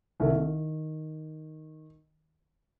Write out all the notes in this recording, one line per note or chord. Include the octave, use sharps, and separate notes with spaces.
C2 D#3 A4
D#3